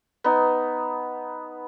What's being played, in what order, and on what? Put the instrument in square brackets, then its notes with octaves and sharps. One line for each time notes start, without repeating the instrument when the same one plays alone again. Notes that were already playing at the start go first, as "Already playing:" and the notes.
[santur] B3 D#4